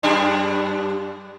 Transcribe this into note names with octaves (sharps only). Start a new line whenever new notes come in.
F#2 G3 D4